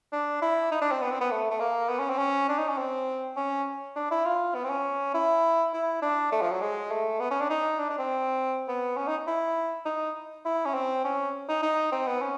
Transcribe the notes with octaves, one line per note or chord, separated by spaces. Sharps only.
D4
E4
D#4
D4
C4
B3
C4
B3
A3
A3
A#3
B3
C#4
C4
C#4
D4
D#4
C#4
C4
C#4
D4
E4
F4
B3
C4
C#4
E4
E4
D4
A3
F3
F#3
G#3
A3
B3
C#4
D4
D#4
D4
D4
C4
B3
C#4
D#4
E4
D#4
E4
C#4
C4
C#4
D#4
D#4
C4
B3
C#4